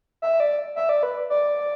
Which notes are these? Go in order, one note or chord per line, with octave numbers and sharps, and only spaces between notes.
E5
D5
E5
D5
B4
D5